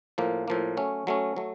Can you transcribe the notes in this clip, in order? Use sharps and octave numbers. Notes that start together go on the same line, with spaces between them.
A2 F3 A#3
A2 F3 A#3
F#3 A3 C#4
F#3 A3 C#4
F#3 A3